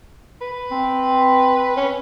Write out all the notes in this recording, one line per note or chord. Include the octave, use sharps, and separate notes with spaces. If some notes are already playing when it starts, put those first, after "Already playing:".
B4
C4
C#4